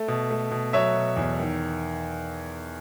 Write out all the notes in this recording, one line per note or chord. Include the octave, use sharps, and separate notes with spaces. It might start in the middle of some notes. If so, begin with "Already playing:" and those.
Already playing: A3
B2
A3
B2
F#3 C#5 E5
B2
E2
D#3